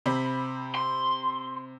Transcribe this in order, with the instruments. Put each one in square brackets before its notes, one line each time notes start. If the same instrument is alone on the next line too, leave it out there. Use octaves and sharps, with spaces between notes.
[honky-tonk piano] C3 C4 B5
[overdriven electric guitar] C6